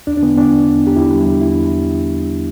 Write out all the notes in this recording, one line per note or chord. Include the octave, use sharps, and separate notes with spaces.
E2 D4
D4
D3 B3
E2 D4
E2
E2
E2
G4
E2 E4
G3
E2
E2 E4